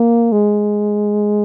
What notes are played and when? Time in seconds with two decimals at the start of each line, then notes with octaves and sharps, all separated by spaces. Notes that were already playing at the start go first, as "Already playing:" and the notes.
Already playing: A#3
0.32 G#3